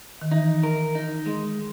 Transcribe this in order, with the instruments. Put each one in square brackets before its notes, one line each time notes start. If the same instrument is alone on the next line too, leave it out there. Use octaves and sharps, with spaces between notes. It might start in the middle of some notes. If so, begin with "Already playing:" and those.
[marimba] D#3
[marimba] E3 [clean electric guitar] D#4
[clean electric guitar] A#4
D#4
G#3